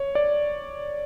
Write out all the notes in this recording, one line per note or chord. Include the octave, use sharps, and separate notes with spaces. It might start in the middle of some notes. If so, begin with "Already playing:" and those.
Already playing: C#5
D5